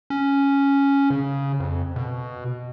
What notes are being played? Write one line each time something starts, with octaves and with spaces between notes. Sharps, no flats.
C#4
C#3
F2
B2